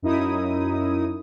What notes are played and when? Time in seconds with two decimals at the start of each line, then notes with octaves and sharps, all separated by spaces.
0.02 F#2 D#4 E4 D#6